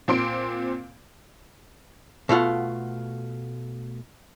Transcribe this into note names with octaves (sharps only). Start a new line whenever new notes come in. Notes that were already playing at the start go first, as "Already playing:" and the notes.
A#2 C4 C6 D7
B2 A3 F4 F#5